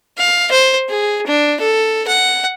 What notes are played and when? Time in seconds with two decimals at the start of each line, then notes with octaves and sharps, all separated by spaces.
0.18 F5
0.51 C5
0.89 G#4
1.26 D4
1.60 A4
2.07 F#5